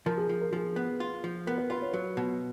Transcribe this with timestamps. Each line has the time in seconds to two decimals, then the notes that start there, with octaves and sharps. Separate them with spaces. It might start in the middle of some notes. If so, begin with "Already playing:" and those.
0.06 F3 A#4
0.17 G#4
0.29 F3
0.41 A#4
0.53 F3 G#4
0.76 B3
1.00 F4
1.24 F3
1.47 B3 A#4
1.58 B4
1.70 F4 B4
1.82 C#5
1.93 F#3 B4
2.17 B2